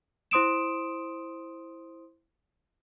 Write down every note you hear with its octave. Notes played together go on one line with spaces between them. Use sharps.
E4 C5 C6 D#6 D7 E7